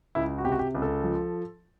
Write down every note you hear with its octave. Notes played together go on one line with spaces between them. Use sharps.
C#2 E4
F#4
C3 G4
F#4
G4
C#2
A4
F3